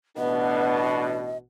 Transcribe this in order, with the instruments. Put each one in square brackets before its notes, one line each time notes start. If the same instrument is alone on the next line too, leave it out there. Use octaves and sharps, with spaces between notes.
[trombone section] A1 B2 [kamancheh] B3 [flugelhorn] D4 [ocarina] D#5